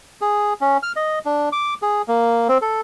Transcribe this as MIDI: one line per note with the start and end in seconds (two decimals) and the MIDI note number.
0.21 0.53 68
0.61 0.77 61
0.83 0.92 89
0.96 1.19 75
1.25 1.49 62
1.52 1.74 86
1.82 2.02 68
2.08 2.48 58
2.48 2.58 60
2.61 2.81 69